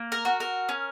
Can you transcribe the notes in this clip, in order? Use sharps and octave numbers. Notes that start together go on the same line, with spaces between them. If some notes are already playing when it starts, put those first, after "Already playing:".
Already playing: A#3
A#4
F#4
A#4
C#4